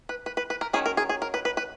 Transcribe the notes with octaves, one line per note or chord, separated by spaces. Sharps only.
B4
B4
B4
B4
A#4
D#3 F#3 C#4 G#4
A#4
G#4
G#4
A#4
B4
B4
B4